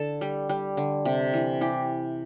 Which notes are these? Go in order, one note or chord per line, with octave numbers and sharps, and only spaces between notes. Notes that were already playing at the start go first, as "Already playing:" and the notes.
Already playing: D3 A4
G3
G3
D3
C3
E3
E3 G4